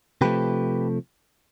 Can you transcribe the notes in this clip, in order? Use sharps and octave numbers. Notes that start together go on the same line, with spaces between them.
C3 F3 A3 G4 B4